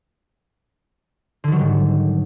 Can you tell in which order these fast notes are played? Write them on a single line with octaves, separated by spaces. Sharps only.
D3 D#3 F#3 G3 G#2